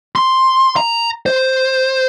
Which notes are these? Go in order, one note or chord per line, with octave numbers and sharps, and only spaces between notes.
C6
A#5
C5